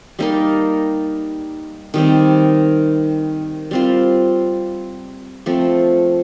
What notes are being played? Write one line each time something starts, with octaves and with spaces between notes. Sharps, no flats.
G3 A#3 D#4 A#4
D#3 G3 C4
G3 C4 F4
F3 A3 C4